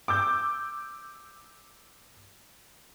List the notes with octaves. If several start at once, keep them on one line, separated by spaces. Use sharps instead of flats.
D6 E6 G6